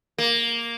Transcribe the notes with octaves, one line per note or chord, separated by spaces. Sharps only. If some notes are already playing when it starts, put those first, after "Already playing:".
A#3